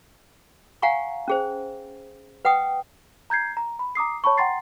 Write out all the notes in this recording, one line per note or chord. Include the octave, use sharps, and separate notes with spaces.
F5 F#5 G#5 A#5 C#6
C#4 G#4 C5
B4 F#5 G5 D#6
A#5 G6 G#6 C7
A#5
B5
A#5 D6 D#6 C7
C#5 A5 B5 C#6
F#5 G5 A#5 C6 A6 C7